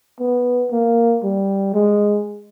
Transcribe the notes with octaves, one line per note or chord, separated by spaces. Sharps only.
B3
A#3
G3
G#3